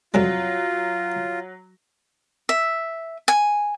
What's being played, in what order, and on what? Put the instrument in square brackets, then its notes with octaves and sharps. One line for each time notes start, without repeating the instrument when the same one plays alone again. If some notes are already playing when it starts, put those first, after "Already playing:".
[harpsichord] F2 C3 G3 [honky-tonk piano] F#3 [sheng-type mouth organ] F4
[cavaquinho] E5
G#5